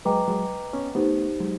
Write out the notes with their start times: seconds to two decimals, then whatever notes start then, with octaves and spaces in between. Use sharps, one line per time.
0.05 F#3 G#3 B4 D#5 G5 A#5 D6
0.28 F#3 G#3
0.73 B3 C#4
0.95 A3 B3 D#4 G4 C5
1.40 F#3 G#3